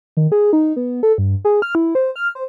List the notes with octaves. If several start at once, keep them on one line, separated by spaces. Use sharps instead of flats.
D#3
G#4
D#4
B3
A4
G2
G#4
F6
E4
C5
F6
C5